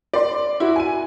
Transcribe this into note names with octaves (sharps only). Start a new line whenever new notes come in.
D5 C6
E4 F#4
G#5 D#7